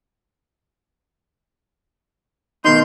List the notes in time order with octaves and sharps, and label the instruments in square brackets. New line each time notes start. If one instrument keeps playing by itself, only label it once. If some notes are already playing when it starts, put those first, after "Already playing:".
[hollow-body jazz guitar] B2 D#3 D#4 [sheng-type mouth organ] C6 G6